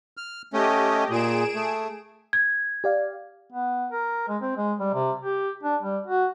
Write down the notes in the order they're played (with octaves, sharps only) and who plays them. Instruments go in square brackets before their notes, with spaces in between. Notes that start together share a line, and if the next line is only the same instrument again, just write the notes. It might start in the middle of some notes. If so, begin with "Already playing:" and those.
[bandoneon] F6
[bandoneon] A3 C#4 [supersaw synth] G4 D#5
[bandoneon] A#2 [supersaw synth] G#4 D7 E7
[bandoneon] A3
[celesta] G#6
[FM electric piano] G4 D5 F5
[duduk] B3
A#4
G#3
C4
G#3
G3
C3
G4
D4
G3
F#4